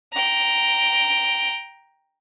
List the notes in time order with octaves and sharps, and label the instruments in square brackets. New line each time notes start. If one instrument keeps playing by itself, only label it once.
[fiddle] G5 A#5